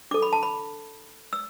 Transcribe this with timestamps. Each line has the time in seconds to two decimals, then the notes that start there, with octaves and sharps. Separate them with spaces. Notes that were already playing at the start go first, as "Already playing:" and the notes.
0.11 D4 A4 D6
0.22 B5
0.33 A5
0.43 B5
1.33 E6